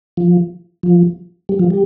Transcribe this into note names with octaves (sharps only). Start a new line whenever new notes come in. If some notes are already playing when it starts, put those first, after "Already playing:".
F3
F3
G3
F3
G3